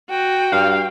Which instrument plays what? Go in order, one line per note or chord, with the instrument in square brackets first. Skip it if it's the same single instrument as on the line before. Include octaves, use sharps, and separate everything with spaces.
[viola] F#4 [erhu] G5
[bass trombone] G2 [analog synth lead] F5